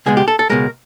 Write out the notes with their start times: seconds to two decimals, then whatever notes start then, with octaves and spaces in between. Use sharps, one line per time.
0.06 C#2 B2 G#3 G#4
0.17 G4
0.28 A4
0.39 A4
0.50 C#2 B2 G#3 A#4